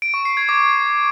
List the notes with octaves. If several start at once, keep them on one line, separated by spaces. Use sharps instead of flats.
D7
C#6
C7
G#6
D6